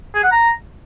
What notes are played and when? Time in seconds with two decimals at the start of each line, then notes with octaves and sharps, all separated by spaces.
0.15 G#4
0.23 F#5
0.32 A#5